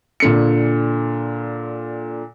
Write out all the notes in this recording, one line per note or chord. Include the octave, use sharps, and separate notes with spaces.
A#2 D3 C#7